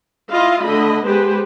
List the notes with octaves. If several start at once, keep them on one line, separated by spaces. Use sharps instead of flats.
E4 F4 D#5 F5
D3 A3 D#5 B5
G#3 B3 G4 G#4 B4 C5